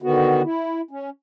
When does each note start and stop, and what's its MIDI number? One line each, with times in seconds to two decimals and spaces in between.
0.02 0.42 50
0.02 0.42 51
0.02 0.42 59
0.02 0.42 66
0.44 0.81 64
0.91 1.10 61